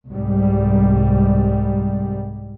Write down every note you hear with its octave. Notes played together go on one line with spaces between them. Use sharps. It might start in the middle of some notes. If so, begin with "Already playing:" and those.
C2 G#2 G3